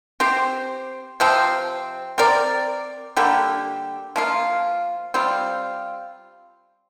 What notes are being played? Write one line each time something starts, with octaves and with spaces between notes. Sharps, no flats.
C4 G4 C5
C3 F3 C4
C4 A#4 D5
D3 G3 A#3 G4
F3 A#3 F4
G3 C4 F4